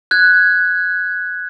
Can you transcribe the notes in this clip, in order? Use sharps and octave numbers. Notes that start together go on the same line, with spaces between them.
F#6 G#6